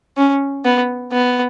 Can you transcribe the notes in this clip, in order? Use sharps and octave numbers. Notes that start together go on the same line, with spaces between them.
C#4
B3
B3